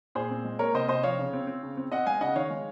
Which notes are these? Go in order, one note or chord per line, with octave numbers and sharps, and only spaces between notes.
A#2 G#4 C5
C4
G#3
A#3 A#4 C#5
C3 C5 D#5
C3 C5 D#5
F3 C#5 F5
C#3
C4
C4
C#3
C4
C4 D#5 F#5
G#3 F5 G#5
C#3 D#5 F#5
D#3 C#5 F5
G#3